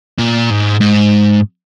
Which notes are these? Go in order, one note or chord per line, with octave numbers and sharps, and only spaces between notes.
A#2
G#2
G#2